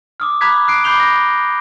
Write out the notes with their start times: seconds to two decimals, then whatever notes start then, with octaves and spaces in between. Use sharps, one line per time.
0.20 D6 D#6 F6
0.41 A#5 B5 D6 F#6 G#6 B6
0.67 D#6 F#6 C7 D7
0.84 B5 D6 G6 C7 F7 G7
1.00 A#6